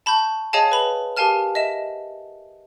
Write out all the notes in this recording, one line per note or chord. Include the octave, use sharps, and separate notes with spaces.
A5 B5 C#6 G6
G#4 C#5 D#5 F5 G#5 A5
B4 B5 F7
G4 A#4 F5 G#5 A5 F6
D#5 E5 E7